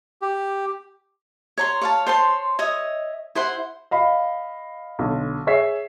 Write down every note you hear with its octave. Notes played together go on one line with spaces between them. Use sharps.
G4
C#5 A#5 C6
C#5 F5 A5
C5 C#5 A5 C6
C#5 D#5 E5 D#6
E4 C5 F#5 C6
D#5 F5 B5
B1 D3
G#4 C#5 E5 B6 C7